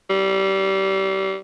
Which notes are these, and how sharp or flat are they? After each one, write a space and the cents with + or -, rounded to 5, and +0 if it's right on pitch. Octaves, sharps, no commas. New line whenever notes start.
G3 -25